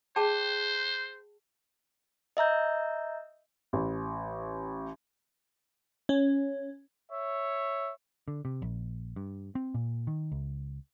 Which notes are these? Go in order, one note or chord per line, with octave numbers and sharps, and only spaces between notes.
G#4 C5 G5 A5
D#5 E5 A#5 G6
A1
C#4
C#5 E5
D3
C3
A#1
G2
C4
A#2
D#3
C#2